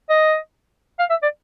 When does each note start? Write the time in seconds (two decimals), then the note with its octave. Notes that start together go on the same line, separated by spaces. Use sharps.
0.09 D#5
0.99 F5
1.10 E5
1.23 D5